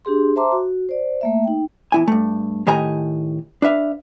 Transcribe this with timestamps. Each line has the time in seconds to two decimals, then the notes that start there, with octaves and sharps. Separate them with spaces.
0.05 D4 G4 G#4 C6
0.36 C5 E5 A5 A#5 C6 D6
0.52 F#4
0.89 C5 D5
1.21 A3 A#3 E5
1.44 D#4 G5
1.92 E2 E4 G#5
2.08 G2 A3
2.67 A2 D#3 G4 D#5 G#5 A#5
3.62 D4 B4 E5 F5